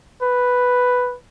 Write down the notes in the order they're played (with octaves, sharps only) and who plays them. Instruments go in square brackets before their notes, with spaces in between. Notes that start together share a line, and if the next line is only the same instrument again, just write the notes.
[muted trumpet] B4